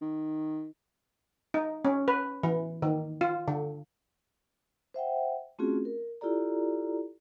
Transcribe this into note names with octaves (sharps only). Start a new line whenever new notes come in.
D#3
D#4
C#4
B4
E3
D#3
F4
D3
C5 E5 F#5 G5
A3 C4 C#4 F4 F#4 G#4
A#4
E4 F4 G4 A4 D5 A#5